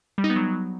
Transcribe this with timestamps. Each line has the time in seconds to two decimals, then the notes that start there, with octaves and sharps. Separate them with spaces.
0.18 G3
0.24 D#4
0.30 B3
0.36 F#3